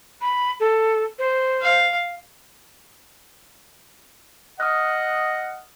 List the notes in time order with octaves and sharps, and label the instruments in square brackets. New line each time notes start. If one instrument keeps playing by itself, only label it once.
[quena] B5
A4
C5
[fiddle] F5
[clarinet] D#5 [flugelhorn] F#5 [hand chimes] D#6 F6 F#6